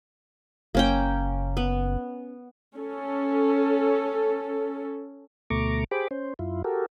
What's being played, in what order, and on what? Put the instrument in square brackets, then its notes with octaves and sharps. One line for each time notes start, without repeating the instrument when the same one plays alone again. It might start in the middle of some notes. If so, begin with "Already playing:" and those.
[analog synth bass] F#1 [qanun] A#3 C#4 G5
[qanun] B3
[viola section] C#4 A4
[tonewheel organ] D2 B2 A3 A#5 C#6 D6
G4 G#4 C5 B5 D6
C#4 C5
F#2 E4 F4
F#4 G4 A4 A#4